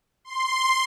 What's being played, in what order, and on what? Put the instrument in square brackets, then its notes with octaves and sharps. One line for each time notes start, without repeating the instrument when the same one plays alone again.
[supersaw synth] C6